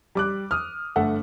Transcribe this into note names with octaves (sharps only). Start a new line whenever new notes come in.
G3 D6 F#6
D#6 F6
G1 A3 A4 F#5